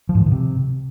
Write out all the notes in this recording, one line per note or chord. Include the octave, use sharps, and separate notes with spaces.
F3
G#2
E3
D#3
C3